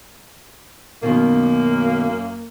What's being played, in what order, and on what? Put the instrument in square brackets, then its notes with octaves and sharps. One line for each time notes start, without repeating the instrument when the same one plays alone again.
[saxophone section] F#2 A#3 [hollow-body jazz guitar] B2 D#3